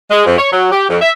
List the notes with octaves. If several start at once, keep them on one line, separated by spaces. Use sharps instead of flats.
G#3
F2
C#5
F#3
G4
F2
E5